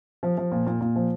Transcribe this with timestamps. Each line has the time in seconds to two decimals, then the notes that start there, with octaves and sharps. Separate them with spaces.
0.23 F3
0.37 F3
0.52 A#2
0.67 A#2
0.81 A#2
0.96 F3